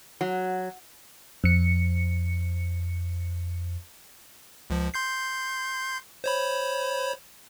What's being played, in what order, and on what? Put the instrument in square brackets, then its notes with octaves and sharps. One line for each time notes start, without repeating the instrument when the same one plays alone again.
[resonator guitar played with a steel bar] F#3
[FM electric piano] F2 C#7
[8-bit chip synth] C#2 F3
C6 G6 C7
C5 C#5 B5